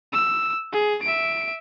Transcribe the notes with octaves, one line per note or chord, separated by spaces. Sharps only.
E6
G#4
E5 D7